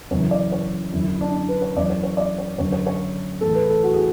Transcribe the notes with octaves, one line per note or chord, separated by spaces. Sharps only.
F#2 C#3 E3 C#5
D5
C#5
F#2 D3 E4
E4
D4
D4
B4
C#5
F#2 E3 D5
C#5
C#5
D5
C#5
F#2 D3 C#5
C#5
C#5
A2 E3 A4
B4
A4
F#4
G#4